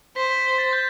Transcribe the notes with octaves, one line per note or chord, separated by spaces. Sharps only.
C5 B6
B6
A6
G6